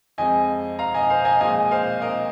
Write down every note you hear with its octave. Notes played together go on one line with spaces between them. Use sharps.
F2 F3 G#3 C4 D#5 G#5
F5 A#5
D#5 G#5
C5 F5
D#5 G#5
A#2 F3 G#3 D#5 G#5
C5 F5
A#4 D#5